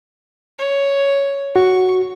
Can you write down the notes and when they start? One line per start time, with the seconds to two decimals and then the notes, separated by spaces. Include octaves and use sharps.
0.59 C#5
1.56 F#4 C#6